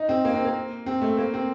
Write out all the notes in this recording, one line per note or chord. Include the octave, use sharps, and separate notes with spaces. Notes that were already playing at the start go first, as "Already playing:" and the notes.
Already playing: D#4
C4
A#3
C4
A#3
C4
A3
A#3
C4